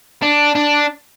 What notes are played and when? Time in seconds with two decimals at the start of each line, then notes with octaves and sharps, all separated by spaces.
0.22 D4
0.55 D4